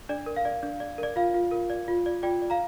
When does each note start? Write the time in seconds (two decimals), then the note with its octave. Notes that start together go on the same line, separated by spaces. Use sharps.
0.09 D4 D5
0.26 A#4
0.36 F5
0.45 D5
0.63 D4
0.80 D5
0.98 A#4 D5
1.16 F4 F5
1.34 F4
1.51 A#4
1.70 D5
1.88 F4
2.06 D5
2.23 F4 D5 G5
2.42 D5
2.50 F5 A#5